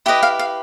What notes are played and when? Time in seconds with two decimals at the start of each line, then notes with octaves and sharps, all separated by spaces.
0.06 E4 G4 B4 D#5 E5
0.23 F5
0.39 F5